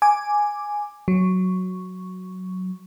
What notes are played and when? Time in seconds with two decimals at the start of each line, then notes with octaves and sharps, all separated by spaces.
0.02 G#5 D6
1.08 F#3